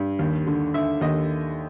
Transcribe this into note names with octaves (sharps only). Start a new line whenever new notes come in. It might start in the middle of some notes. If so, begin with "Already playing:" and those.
Already playing: G2
D#2
D3
D3 E5
D#2 D#5